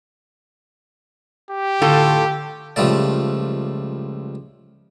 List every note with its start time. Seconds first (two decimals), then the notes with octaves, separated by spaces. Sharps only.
1.51 G4
1.82 A2 D3 F4 A4
2.76 C#2 F3 G3 A3 D5